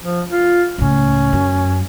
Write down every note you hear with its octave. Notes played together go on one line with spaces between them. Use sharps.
F3
F4
C#2 A2 C#4
F#2